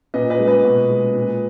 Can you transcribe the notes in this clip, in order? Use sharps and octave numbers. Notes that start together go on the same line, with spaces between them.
A#2 B4 D#5
B4 D#5
G#3
B4 D#5
B2
G#3
A#2